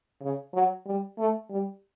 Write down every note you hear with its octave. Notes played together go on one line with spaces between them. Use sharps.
C#3
F#3
G3
A3
G3